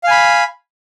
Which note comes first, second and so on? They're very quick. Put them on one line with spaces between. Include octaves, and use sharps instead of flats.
F5 G#5 B5